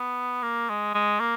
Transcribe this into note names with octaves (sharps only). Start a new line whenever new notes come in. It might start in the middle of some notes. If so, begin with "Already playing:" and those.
Already playing: B3
A#3
G#3
G#3
A#3